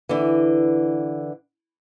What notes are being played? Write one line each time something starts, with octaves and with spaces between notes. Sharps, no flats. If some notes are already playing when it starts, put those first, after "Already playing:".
D3 E3